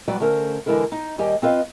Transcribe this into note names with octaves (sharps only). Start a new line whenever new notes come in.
F#3 G3 F#4 B4 D5
D3 A3 C#4 A#4 C5
D3 E3 G#3 E4 A#4 B4
D#4
D#2 G3 G4 D#5 G#5
C4 F4 B4 D#5